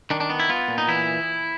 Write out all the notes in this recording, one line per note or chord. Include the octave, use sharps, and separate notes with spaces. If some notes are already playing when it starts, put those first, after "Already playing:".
D#3 D4
D4
B3
E4
B3 F4
A#2
D#4
E3 E4